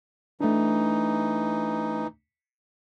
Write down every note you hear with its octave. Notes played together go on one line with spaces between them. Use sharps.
E3 A3 D4 D#4